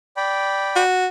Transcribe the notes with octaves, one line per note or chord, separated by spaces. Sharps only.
D5 G5 B5
F#4